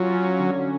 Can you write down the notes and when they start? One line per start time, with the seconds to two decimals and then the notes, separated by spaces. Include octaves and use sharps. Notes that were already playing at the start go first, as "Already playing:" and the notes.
Already playing: F#3 C#4 F4
0.12 C#4
0.39 D3